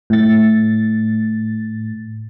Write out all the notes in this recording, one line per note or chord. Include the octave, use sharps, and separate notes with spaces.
A2 A6